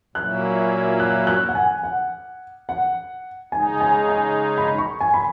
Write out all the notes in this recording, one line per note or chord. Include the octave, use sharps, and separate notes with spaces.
A#2 F#3 A#3 C#4 E4 F#6
F#6
F#6
F#5
G#5
F#5
F#5
C#3 G#3 D#4 G#5
G#5
G#5
B5
C#6
G#5
B5